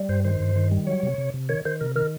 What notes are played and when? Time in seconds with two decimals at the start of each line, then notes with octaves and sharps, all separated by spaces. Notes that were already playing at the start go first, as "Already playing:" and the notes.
Already playing: G3
0.09 G2 C5
0.25 D#3 C5
0.40 G2
0.56 D#3
0.72 G3
0.87 F#3 C#5
1.03 C3
1.18 C3
1.34 C3
1.49 D#3 C#5
1.65 D#3 C5
1.81 C3 A#4
1.96 D#3 A#4